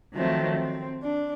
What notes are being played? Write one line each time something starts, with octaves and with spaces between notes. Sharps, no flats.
D#3 F3 F#3 A3 C4
C4
D4